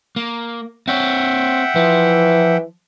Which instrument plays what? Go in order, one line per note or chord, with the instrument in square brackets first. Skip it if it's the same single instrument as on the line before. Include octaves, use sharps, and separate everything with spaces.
[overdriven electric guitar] A#3
[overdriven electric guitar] C4 C#5 [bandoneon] E5 F#5 G5
[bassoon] E3 [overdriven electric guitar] F3